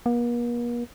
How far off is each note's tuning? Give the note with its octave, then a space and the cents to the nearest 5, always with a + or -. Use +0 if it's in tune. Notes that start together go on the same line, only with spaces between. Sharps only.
A#3 +45